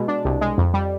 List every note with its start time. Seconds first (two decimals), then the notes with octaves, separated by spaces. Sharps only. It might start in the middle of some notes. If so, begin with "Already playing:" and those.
Already playing: B2 G#3
0.08 D4
0.25 C2
0.41 G#3
0.58 F2
0.74 G3